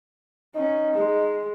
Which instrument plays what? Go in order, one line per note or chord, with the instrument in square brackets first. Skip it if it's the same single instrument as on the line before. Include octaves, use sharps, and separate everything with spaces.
[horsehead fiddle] C#4 [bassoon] D#4
[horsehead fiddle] G#3